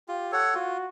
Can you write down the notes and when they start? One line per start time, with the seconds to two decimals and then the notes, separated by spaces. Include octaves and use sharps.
0.08 F4 G4
0.32 A4 C#5 F#5
0.54 F4 F#4